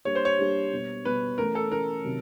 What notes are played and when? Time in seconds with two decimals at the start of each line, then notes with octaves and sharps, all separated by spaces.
0.05 G3 A#3 D4 G4 C#5
0.15 C5
0.25 C#5
0.39 G3 A#3 D4 G4
0.72 B2 G3 B3
1.05 B2 G3 B3 B4
1.38 E3 A3 C#4 A#4
1.55 A4
1.72 E3 A3 C#4 A#4
2.05 C3 D#3 F#3